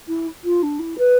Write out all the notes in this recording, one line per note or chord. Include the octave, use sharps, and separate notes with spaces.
E4
F4
D4
E4
B4